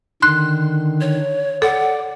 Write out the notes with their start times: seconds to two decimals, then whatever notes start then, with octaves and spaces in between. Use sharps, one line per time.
0.22 D3 D#3 C6 F#6
1.01 C#5
1.62 A4 D5 F#5